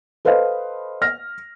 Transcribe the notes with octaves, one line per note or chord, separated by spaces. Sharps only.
A4 B4 C5 D#5 F5
F6 A#6